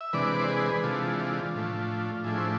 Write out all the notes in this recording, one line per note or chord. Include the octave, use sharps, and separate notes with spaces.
E5
C3 E3 G#3 D4 B4 D5
C5
G#4 B4
C3 E3 G#3 D4 F4 A4
F4
A2 F3 A3 D4
A2 F3 A3 D4 E4 G#4
C5